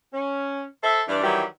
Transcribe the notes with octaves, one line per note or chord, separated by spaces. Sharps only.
C#4
A4 C5 E5
G2 E3 D4
D#3 E3 F#3 G3 G4